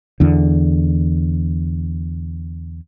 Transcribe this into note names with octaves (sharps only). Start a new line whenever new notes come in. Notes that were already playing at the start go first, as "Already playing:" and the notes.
E2 D3